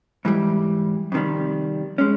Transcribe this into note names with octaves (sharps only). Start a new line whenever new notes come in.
G#2 E3 G3
F2 C3 D#3 G3
G#3 C#4